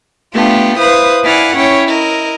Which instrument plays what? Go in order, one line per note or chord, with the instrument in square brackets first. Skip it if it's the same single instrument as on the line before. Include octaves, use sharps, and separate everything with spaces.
[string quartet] A3 B3 D4 F4 G4
E4 B4 C5 F5 D#6
E4 D5 F5 F#5 G#5
C#4 E4 C#5 G5
E4 A#4 D#5